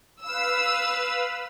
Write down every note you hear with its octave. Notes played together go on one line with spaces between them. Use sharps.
B4 F5 E6